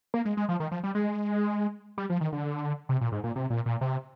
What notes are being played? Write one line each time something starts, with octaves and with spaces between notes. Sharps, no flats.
A#3
G#3
G#3
F3
D#3
F3
G3
G#3
G3
F3
D#3
D3
C3
A#2
G#2
A#2
C3
A#2
A#2
C3